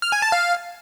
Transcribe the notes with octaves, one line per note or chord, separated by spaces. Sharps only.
F6
G#5
A5
F5